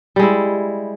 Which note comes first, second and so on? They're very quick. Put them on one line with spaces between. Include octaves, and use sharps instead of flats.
G3 G#3 E4